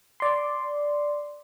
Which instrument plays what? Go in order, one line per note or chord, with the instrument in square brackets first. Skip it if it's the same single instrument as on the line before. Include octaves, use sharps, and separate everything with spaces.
[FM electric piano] D5 C6